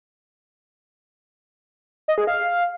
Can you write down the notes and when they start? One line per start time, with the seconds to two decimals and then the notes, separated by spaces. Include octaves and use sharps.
2.08 D#5
2.18 G#4
2.27 F5